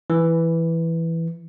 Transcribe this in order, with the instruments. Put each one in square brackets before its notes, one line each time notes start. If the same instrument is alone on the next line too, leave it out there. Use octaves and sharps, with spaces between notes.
[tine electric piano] E3